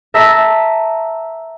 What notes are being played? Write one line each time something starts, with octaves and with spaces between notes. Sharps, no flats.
E5 A5 A#5 E6 B6